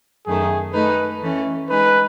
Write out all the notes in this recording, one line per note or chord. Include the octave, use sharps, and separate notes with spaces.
F#2 D#3 A3 G#4
A3 D#4 A4 B4
E3 A3 C#4
G#3 D#4 G#4 B4